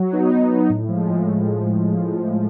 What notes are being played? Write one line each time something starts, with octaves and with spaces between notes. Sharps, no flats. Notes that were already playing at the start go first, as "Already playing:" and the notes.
Already playing: F#3
B3 D#4
F#3
B3 D#4
A2
F3 G#3
A2